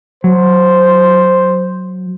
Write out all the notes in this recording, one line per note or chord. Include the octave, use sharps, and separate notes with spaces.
F#3 C5